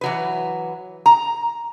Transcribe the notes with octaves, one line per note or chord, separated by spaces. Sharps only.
E3 F#3 B4
A#5